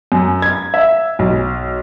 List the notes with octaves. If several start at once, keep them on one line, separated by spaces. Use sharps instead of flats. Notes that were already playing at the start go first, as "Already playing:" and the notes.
F#2
G#6
E5
B1